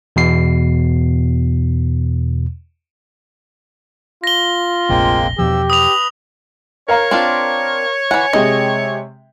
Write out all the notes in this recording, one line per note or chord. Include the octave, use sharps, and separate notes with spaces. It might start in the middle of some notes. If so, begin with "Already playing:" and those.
E2 B2 C7
F4 A#6 G7
F1 A#1 G#3 A#3 C4
E2 G2 B2 F3 G4 E6
B4 D#6 F7
A#4 C#5 F5 A#5
C4 D4 F4
E3 F#5 G#5
C3 G#3 D#5 G5